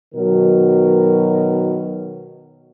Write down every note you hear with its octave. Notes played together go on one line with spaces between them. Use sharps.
B2 D#3 F#3 A#4